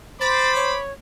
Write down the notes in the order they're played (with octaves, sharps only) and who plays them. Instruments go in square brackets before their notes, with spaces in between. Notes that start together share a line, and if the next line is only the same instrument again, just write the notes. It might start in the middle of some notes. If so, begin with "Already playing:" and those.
[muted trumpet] C5 [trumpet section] B5 D6 [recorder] A6
[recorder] C#5